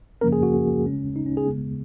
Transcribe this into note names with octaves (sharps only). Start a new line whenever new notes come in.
F#2 C#3 F3 A#3 C#4 A#4
G#4
F#4
C#3 G#3 C#4
D#4
C#4
G#4
C#3 G#3 B3